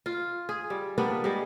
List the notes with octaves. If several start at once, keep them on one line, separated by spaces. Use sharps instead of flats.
F4
G#4
G3
G3 A#3 B3 D4
G3 G#3